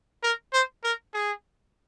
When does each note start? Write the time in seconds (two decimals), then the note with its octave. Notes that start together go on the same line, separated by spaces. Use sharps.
0.23 A#4
0.53 C5
0.84 A#4
1.14 G#4